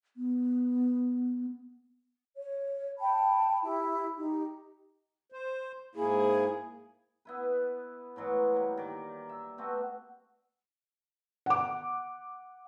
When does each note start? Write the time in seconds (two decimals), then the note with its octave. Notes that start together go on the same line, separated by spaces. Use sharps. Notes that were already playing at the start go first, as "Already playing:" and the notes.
0.17 B3
2.36 C#5
2.98 G5 A5 B5
3.63 E4 G4
4.17 D#4 G4
5.32 C5
5.95 G#2 A#3 E4 G#4
7.25 B3 E4 B4
8.16 A2 E3 F#3 G#3
8.55 G3 A#3
8.77 D#3 D5 D6
9.29 E5
9.58 A3 B3 C4 F#4
11.46 F#5 D6